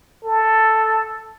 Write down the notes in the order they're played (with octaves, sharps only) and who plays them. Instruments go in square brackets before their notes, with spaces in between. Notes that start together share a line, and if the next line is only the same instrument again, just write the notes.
[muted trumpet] A4